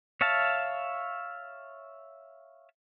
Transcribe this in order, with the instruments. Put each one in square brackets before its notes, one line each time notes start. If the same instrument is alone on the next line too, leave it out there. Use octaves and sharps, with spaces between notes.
[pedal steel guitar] C#5 E5 F5 A5